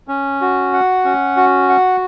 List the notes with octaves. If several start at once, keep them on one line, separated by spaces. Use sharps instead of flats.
C#4
F#4
F#5
C#4
F#4
F#5